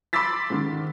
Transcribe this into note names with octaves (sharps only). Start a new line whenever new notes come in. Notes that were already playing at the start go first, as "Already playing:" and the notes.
B5 C6 D6 E6 A6 B6
G#2 D#3